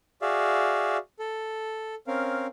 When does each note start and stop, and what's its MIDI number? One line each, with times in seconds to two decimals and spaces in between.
0.22 0.97 66
0.22 0.97 68
0.22 0.97 74
0.22 0.97 76
0.22 0.97 77
1.19 1.95 69
2.07 2.47 60
2.07 2.47 61
2.07 2.47 70
2.07 2.47 77